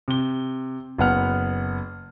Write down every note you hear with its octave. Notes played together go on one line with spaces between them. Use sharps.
C3 G7
F#1 B3 F#5 F6